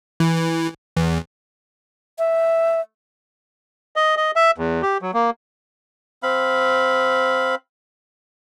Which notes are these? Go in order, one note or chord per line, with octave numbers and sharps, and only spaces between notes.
E3
E2
E5
D#5
D#5
E5
E2
G4
F#3
A#3
C4 F5 B5